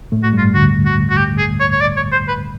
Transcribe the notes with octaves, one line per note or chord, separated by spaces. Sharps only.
A2 A3
F#4
G2 G3
F4
D2 D3 F#4
F#4
F#4
G4
G#4
C#5
C#5
D5
C#5
C5
B4